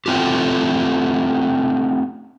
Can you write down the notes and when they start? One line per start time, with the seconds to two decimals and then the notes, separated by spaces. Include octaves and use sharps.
0.06 A3 B3 C4 F4 G4